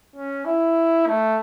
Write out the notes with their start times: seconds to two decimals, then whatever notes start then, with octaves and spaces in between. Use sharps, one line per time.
0.16 C#4
0.45 E4
1.07 A3